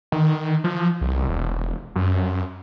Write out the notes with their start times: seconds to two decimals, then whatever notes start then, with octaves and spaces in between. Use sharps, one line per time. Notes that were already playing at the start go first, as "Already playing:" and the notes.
0.12 D#3
0.64 F3
1.01 C2
1.29 E1
1.96 F#2